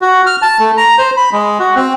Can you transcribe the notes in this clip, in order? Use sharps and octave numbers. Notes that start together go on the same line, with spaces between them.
F#4
F6
A5
A3
A#5
C5
B5
G#3
F#4
C4